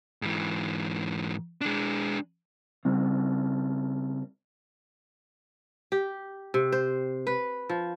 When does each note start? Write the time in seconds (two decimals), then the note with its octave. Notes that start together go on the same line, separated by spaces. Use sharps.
0.22 G#2 E3
1.61 G#3 D4
2.85 C#3 G3 C4
5.92 G4
6.54 C3
6.72 C5
7.27 B4
7.70 F3